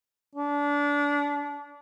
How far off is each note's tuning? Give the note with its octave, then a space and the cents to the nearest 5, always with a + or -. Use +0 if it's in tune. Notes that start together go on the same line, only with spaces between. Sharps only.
D4 -25